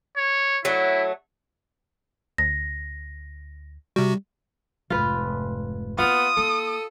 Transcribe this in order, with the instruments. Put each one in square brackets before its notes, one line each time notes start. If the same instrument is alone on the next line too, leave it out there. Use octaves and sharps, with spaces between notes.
[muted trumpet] C#5
[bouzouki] F#3 A3 [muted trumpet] E4
[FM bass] D2 [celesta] A#6
[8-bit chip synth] C3 F#4 [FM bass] G3
[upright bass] F1 G#2 [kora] F4 B4
[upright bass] A#3 D#4 [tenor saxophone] B3 [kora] F4 F5 [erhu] D#6
[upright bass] A#3 E4 [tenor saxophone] A4